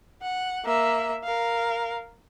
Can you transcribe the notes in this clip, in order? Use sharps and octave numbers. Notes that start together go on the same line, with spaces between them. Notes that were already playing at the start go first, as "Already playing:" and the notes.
F#5
A#3 E5
A#4 F5